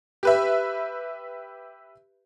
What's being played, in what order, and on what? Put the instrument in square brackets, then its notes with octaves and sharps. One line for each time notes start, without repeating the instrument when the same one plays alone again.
[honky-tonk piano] G4 B4 E5